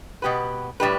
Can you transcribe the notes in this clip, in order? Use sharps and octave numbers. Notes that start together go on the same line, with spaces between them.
B2 B3 G4 B4
A2 G3 D4 G4 B4